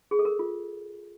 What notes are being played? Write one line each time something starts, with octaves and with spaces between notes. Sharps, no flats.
G#4
A4
A#4
F4